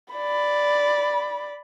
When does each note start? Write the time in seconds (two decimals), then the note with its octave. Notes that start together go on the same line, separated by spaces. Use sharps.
0.14 D5 B5